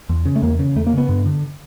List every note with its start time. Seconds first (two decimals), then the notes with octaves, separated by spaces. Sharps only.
0.09 E2
0.25 C#3
0.36 A3
0.42 E2 A#3
0.59 C#3
0.76 E2 A3
0.87 A#3
0.93 C#3
0.98 B3
1.09 G2
1.26 D3